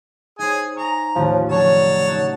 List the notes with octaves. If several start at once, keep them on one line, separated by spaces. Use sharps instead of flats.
D#4 G#4 C5 G#5 D#6
G#5 A#5 C#6 D#6
A1 D#2 F3
C#3 F3 F#3 D4 C#5 A5
D#4 F#5 C#6